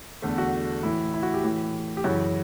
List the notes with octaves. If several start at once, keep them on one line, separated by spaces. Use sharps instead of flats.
E2 D3 A3
F#4
A2 E3 E4
E4
F#4
G4
A2 E3
G4
F#2 C#3 E3 F#4